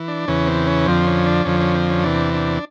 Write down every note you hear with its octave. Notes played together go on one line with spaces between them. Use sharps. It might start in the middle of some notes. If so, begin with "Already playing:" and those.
Already playing: E3
D4
E2 C#3 E3 C#4
C4
C#4
F2 D3 F3 C4
C#4
D4
F2 D3 F3 C#4
C#4
C4
C#4
E2 C3 E3 D4
D4